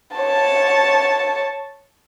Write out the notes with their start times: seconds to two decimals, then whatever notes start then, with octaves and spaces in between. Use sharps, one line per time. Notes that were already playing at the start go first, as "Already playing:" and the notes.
0.17 C#5 A5